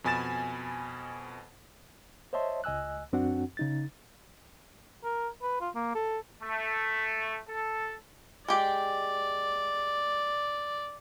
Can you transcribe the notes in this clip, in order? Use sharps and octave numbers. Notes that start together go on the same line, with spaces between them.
F2 B2 G#5 B5 A6 E7
C5 C#5 D#5 E5 A5 C6
C#2 D#5 G#5 E6 F#6
F#2 C4 D4 F#4 F#5
C#3 D#4 A6
A#4
B4
F4
A#3
A4
A3
A4
G#3 G4 D5